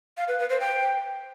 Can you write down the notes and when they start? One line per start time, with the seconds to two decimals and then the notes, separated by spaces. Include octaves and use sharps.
0.17 F5
0.28 B4
0.39 B4
0.50 C5
0.60 G5